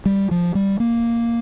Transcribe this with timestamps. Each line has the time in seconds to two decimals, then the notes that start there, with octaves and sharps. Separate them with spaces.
0.06 G3
0.31 F3
0.55 G3
0.80 A#3